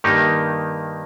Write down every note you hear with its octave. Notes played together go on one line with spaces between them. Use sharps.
G2 D#3 A#3 D#4 G4